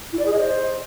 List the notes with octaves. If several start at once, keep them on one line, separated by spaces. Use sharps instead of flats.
E4
D5
G#4
D#5
C5